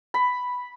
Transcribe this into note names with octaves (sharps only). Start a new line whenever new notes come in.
B5